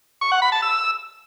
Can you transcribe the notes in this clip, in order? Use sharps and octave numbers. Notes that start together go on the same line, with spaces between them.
C#6
F#5
B5
A5
E6